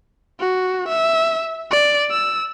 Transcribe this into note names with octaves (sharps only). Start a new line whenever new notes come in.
F#4
E5
D5
E6